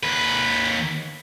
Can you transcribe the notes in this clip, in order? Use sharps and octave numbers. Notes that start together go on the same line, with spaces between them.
D#2 B4